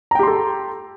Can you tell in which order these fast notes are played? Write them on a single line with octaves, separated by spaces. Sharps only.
A#5 G5 G4 C6 A4